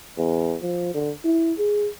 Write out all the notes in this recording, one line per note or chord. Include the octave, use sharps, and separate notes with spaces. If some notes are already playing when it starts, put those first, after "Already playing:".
E2
F3
D3
E4
G#4